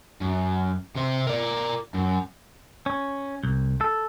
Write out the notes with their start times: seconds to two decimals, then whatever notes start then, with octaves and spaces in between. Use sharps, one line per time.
0.22 F#2
0.96 C3 C5
1.27 A#4 D5
1.94 F#2
2.86 C#4
3.43 C2
3.81 A4